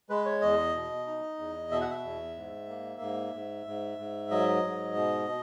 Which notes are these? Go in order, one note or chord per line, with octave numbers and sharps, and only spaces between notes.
G#3 B4
C#5
E2 D#5
B2
D#4
E2
B2 E5
F#5
E5
E2
G#2
A#3
G#2
G#2
G#2
G#2
F#3 D#5
G#2
B2
B2